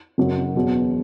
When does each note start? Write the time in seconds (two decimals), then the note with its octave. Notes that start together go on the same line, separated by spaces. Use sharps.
0.18 F#1 F#2 F#3
0.55 E1 E2 B2 F#3